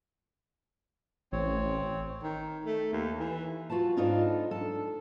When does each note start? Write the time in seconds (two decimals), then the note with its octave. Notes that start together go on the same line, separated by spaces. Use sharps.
1.32 A1 C4 C#5
2.23 D#3
2.65 A3
2.93 D#2
3.19 E3
3.70 F4 F#4 B4 A5
3.97 G#2 D4 D#4 F4 A4 B4
4.51 A4